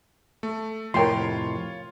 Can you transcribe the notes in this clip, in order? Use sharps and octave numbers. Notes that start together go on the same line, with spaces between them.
A3
F2 A2 C3 F4 A#4 C#5 G5 C6